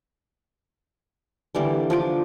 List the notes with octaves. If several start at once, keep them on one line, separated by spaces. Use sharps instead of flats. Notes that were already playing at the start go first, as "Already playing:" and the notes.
D3 E3 G3 A#3
F3 D4 D6